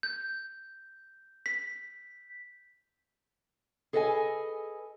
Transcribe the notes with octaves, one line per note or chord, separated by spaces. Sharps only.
G6
B6
G#4 A4 B4 D#5 F5 G#5